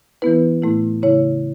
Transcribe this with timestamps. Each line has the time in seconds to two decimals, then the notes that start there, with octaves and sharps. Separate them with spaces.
0.22 E3 B3 E4 B4
0.62 A2 A3 E4
1.02 C#3 A3 E4 C#5